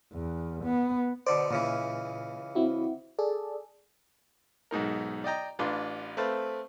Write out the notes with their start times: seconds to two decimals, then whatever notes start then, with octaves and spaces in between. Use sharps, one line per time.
0.13 E2
0.65 B3
1.27 B2 D3 C5 D5
1.51 C#2 A#2 C#3 E3
2.55 C4 E4 F#4
3.19 G#4 A4 D5
4.71 B1 G#2 D#4 A#4
5.24 D5 D#5 G5 A#5
5.59 A1 D4 F4 B4 C6
6.17 A3 C4 B4 F5 A5